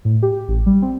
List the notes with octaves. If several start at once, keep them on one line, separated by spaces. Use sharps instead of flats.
A2
G4
A1
G3
C4